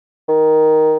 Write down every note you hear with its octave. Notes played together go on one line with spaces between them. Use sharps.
D#3